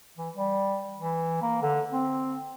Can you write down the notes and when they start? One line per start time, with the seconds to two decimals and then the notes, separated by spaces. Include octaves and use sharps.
0.18 E3
0.36 G3
1.00 E3
1.42 A#3
1.62 D3
1.92 C4